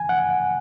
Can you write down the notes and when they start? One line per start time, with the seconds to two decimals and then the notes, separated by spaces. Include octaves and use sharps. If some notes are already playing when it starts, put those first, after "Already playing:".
Already playing: G#5
0.09 F#5